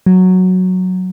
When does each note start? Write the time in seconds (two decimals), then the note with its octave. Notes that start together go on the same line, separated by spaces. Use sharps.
0.06 F#3